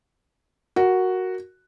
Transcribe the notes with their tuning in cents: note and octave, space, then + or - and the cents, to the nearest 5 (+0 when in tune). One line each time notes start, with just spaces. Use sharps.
F#4 +0 A#4 +0